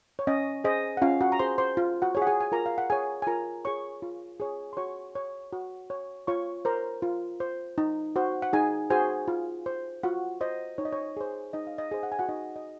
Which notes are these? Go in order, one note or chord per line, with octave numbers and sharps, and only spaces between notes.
C#5
C#4 D#5
G#4 C5 D#5
F#5
C#4 F4 F5
F#4 F#5
A#5
G#4 C5 C6
C5 C6
F4
F#4 F#5
G#4 C#5
F#5
G#4 G#5
G#5
F4 A#4 A#5
F5
F#5
G#4 C#5 G#5
G#5
F4 A#4 A#5
G#4 C#5 C#6
F4
G#4 C#5
C6
F#4 C#5 C#6
C#5
F#4
C#5
F4 C#5 C#6
A#4 C5 A#5
F4
C5
D#4
F#4 C5
F#5
D#4 G#4 G#5
F#4 G#4 C5 G#5
F4
C5
F4 F#4 F#5
C5 D#5
D#4 C#5
D#5
C#5
G#4 C5
D#4 D#5
F5
D#5
G#4 C5
F#5
G#5
F#4 F#5
D#4 D#5
D#5